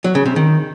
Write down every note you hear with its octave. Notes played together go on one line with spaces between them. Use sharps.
F#3
C#3
C3
D#3